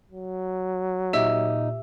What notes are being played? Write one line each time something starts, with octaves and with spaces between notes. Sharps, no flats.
F#3
A#2 D#4 G4 E5 E6